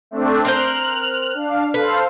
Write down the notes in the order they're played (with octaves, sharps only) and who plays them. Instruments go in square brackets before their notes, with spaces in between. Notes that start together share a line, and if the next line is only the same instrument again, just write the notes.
[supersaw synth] A3 C4 D4
[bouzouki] C4 A#4 C5 [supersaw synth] F6 F#6
[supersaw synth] D4 F5
[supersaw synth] A4 C5 F5 [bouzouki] B4